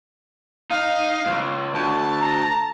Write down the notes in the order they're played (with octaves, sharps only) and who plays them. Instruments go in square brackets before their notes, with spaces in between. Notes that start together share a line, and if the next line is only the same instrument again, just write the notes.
[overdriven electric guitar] D#4 [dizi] F5
[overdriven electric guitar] C#2 G#2
[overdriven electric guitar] D2 [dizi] A5
[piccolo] A#5